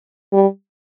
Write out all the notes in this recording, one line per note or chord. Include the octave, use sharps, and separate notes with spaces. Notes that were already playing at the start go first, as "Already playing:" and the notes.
G3